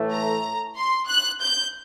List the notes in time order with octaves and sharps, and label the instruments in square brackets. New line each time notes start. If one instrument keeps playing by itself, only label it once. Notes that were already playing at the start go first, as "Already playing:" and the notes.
Already playing: [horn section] A2 E3 A3
[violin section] A#5
C6
F#6
G6